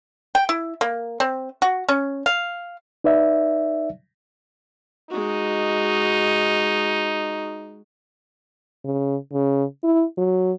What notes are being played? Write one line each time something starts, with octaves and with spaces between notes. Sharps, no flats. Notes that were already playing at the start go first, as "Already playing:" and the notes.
G5
E4
A#3
C4
F#4
C#4
F5
D#4 B4 D5 E5
G#3 D#4 F#4
C#3
C#3
E4
F#3